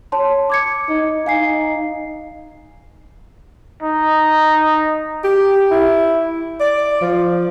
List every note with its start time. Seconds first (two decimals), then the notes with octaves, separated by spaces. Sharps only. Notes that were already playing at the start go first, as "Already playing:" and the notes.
0.12 C#5 A5 C6
0.50 D6 G#6 C#7
0.89 D#4
1.26 D#4 F5 G#5 C7
3.82 D#4
5.24 G4
5.71 E4
6.60 D5
7.01 F3